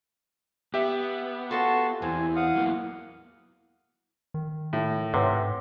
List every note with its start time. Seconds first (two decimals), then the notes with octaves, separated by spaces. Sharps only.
0.74 B3 G4 E5
1.51 C#4 F4 F#4 A4 A5 C6
2.02 E2 E3 C4 G#5
2.36 F5 F#5 D#6
2.56 F#3 A#3 B3
4.34 D#3
4.73 A2 D#4
5.14 G#2 C3 B4 C#5 F#5